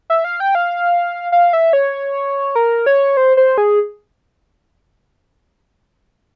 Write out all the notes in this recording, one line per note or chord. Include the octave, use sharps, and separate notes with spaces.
E5
F5
G5
F5
F5
E5
C#5
A#4
C#5
C5
C5
G#4